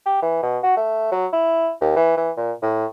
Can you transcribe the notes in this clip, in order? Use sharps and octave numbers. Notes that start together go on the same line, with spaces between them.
G4
E3
B2
F#4
A3
F#3
E4
D#2
E3
E3
A#2
A2